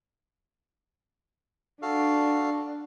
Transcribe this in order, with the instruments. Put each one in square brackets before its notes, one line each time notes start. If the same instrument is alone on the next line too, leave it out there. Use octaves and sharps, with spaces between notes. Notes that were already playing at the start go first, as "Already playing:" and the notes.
[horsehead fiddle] D4 [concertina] F#4 A4 F5